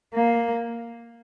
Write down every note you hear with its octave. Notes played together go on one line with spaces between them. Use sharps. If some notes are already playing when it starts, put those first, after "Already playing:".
A#3